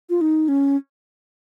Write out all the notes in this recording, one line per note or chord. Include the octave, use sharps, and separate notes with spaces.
F4
D#4
C#4